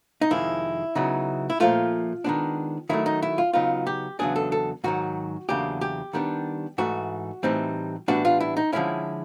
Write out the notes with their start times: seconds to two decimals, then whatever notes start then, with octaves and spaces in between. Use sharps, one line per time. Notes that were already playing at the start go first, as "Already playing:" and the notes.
0.21 D#4
0.31 F2 C3 D#3 G#3 E4
0.95 C#3 F#3 B3 D#4
1.50 E4
1.60 A#2 F3 A3 F4
2.24 D#3 G#3 B3 D4
2.89 D#3 F#3 A3 E4
3.06 D#4
3.22 E4
3.38 F4
3.53 C#3 F#3 B3 D#4 F4
3.87 G4
4.19 E2 C#3 F#3 B3 D4 G#4
4.36 A4
4.52 A4
4.84 G#2 D#3 F#3 F#4
5.49 E2 C#3 F#3 A#3 D4 G4
5.81 G4
6.13 D#3 G3 B3 D4
6.78 G#2 E3 A3 F#4
7.43 A2 E3 G3 C4 D#4
8.08 A2 E3 G3 B3 D4 F#4
8.25 F4
8.40 E4
8.57 D#4
8.72 D3 F3 G#3 C#4 E4